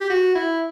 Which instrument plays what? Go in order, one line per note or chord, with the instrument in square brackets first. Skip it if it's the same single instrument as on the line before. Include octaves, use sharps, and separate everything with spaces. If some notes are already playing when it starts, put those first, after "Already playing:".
[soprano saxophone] G4
F#4
E4